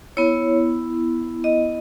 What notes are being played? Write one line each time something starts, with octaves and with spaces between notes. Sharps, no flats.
B3 E4 C#5
D#5